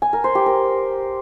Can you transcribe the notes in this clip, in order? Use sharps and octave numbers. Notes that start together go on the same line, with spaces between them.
G#5
A#4
C5
G4
A#4